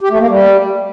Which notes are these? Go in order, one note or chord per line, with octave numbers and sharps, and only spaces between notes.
G4
A3
A#3
G3